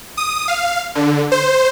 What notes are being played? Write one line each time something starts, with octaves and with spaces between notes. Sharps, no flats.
D#6
F5
D3
C5